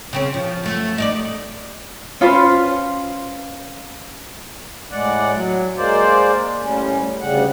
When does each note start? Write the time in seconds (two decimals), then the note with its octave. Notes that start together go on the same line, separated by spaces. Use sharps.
0.13 C#3 C4 C#4
0.34 F3
0.63 F#2 A3
0.98 D#4 A#4 D5
2.21 C#4 F4 B4 C5
4.91 A2 G#3 D5 F#5
5.34 F#3
5.77 G#3 A#3 C5 D5
6.61 A2 G3 C#4
7.21 D2 C#3 G3 F#5